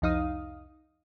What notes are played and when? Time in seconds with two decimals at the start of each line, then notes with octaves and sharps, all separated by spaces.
0.02 C2 F2 D#4 F5 D#6